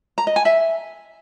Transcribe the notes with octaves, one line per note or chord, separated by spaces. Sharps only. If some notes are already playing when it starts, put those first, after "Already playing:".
A#5
D#5
G#5
E5